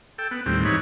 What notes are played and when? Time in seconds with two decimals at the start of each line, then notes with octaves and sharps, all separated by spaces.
0.18 A4 G5
0.31 B3
0.46 D#2 A2 G3 C4
0.65 G#2 E3 D#4 B4 C#5